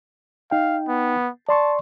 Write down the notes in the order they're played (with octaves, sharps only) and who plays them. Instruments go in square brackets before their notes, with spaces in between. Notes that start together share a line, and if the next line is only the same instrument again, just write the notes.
[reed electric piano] D#4 G5 [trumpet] F5
[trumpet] B3
[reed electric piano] D5 C6 C#6 [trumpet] A5